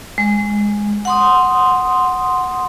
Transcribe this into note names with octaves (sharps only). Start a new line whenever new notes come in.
G#3
F#5 C6 D#6